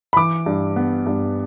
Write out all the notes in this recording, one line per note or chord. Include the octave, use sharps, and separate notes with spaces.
B5
E3 D6
G2
B3
G2